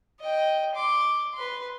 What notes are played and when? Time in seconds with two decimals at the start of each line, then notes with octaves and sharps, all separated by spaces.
0.20 D#5 G5
0.75 C6 D6
1.34 B4 C6